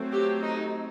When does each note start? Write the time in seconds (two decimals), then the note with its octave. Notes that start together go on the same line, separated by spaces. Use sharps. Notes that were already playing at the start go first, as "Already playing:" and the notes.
Already playing: F#3 A3 C4
0.12 G4
0.43 D#4